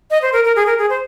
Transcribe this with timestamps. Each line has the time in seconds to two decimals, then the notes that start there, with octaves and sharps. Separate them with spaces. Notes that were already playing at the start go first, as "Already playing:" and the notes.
0.11 D#5
0.22 C5
0.33 A#4
0.44 A#4
0.56 G#4
0.66 A#4
0.78 G#4
0.90 C5